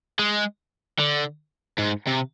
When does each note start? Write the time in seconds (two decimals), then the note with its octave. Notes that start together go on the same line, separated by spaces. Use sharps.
0.19 G#3
0.99 D3
1.79 G#2
2.07 C3